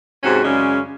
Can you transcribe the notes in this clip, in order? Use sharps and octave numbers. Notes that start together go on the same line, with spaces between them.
G#2 C3 C#4 F#4 G#4
F#2 C#3 G#3 C#4 D5